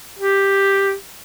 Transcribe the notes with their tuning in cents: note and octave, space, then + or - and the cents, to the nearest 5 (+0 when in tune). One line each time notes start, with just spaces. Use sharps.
G4 +5